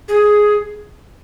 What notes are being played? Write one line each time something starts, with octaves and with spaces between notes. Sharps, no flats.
G#4